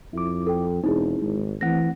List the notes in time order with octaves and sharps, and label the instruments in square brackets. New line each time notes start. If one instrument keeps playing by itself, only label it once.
[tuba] F2 [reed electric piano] E4 D6
[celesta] A4 G5
[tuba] E1 [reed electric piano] C4 [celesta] D#4 E4 G#4
[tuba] G#1 [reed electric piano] G#3
[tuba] E3 [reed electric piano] A3 C4 F#5 [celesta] A#6